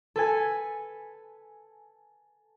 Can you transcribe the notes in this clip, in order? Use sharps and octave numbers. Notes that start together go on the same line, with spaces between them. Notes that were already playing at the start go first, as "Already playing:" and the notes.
A4 B4 G#5